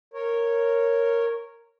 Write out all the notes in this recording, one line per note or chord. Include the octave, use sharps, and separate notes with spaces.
A#4 C#5